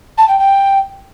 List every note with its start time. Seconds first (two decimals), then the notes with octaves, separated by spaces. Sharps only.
0.18 A5
0.28 G5
0.39 G5